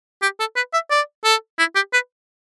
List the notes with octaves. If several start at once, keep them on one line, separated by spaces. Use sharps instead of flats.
G4
A4
B4
E5
D5
A4
E4
G4
B4